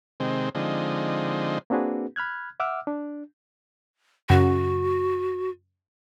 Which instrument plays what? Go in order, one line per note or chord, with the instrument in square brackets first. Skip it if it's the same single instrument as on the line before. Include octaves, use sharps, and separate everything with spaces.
[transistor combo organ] C3 D#3 G#3 C4
D3 F3 G#3 C4 D#4
[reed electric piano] A#3 C4 D4 F#4 G#4 B4
B5 F6 F#6 G#6
E5 F#5 D6 E6 F6
D4
[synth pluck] F#2 C#3 F#5 [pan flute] F#4